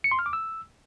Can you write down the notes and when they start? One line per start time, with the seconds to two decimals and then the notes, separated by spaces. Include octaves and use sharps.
0.04 C#7
0.11 C6
0.19 F6
0.26 D6
0.33 E6